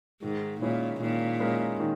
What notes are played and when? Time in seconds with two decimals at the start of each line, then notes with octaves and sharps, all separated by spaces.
0.22 G#2 D#3
0.61 A#2 G#3 C#4 E4 A#4
1.01 A#2 D#3
1.40 G#3 C#4 E4 A#4
1.80 D#3